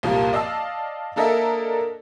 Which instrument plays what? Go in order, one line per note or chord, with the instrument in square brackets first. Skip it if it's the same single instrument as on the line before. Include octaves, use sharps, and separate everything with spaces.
[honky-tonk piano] C2 F2 A#2 F3 G3 A#3
D5 D#5 F5 A5 E6
A#3 D4 A4 A#4 D#5 E5